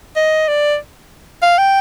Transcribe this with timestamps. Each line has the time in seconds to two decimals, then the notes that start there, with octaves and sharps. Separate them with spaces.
0.16 D#5
0.48 D5
1.42 F5
1.58 G5